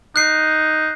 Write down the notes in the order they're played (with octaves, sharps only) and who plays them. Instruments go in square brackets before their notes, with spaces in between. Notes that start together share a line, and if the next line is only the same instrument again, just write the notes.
[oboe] D#4 [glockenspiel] F#6 C7